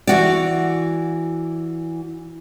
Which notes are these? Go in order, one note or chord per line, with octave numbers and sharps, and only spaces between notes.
E3 F#4 D5